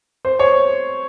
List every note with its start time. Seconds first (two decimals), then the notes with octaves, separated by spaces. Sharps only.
0.25 C5
0.39 C#5